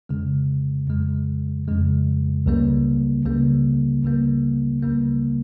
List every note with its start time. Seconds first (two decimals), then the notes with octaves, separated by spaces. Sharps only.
0.09 F2 C#3 G#3
0.88 F2 C#3 G#3
1.68 F2 C#3 G#3
2.46 C#2 C#3 G3 A#3
3.25 C#2 C#3 G3 A#3
4.04 C#2 C#3 G3 A#3
4.82 C#2 C#3 G3 A#3